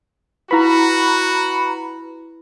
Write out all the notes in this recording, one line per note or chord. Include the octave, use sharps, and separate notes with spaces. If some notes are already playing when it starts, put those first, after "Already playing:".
E4 F#4 B4 A#5 B5